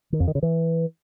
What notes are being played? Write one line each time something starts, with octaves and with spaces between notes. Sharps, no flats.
D#3
F2
D#3
C#3
E3